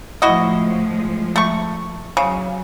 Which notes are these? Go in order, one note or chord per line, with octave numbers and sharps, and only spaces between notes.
A2 F3 G#3 E4 F#4 D#5
A3 C#6
C#3 F#3